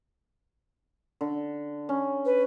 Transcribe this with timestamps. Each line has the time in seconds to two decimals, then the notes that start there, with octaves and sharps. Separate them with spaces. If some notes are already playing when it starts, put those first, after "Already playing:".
1.21 D3
1.89 C#4
2.25 B4